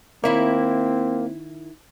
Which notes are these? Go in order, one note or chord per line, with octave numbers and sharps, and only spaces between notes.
D#3 A#3 C4 E4 C#5